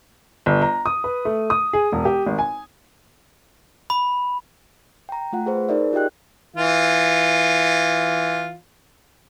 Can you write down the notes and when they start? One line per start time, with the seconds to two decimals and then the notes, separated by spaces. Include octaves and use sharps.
0.46 G1
0.62 A#5
0.86 D#6
1.04 B4
1.25 A3
1.50 D#6
1.73 G#4
1.92 E1
2.05 G4
2.26 G#1
2.39 G#5
3.90 B5
5.09 G5 A#5
5.33 A3 F4 F#5
5.46 G#4 B4 C5
5.69 D#4 G#4 A#4 D5 E5
5.93 F4 G4 D#5 G5 F#6
6.56 E3 F4